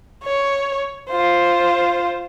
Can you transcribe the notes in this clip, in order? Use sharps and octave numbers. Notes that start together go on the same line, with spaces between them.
C#5
F4 C5